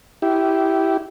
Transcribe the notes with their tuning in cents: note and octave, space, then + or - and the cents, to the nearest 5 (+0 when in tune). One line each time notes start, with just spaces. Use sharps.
E4 -10 G4 -15